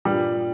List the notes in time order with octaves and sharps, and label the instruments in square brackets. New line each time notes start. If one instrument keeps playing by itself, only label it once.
[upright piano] G2 A#2 [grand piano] G3